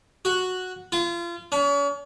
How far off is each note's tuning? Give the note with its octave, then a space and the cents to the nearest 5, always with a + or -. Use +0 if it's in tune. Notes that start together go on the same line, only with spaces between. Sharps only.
F#4 -5
F4 -30
C#4 +40